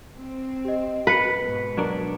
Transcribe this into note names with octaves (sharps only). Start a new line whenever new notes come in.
C4
G4 D#5
B4 B6 C#7
G#2 B2
F#3 D4 A#4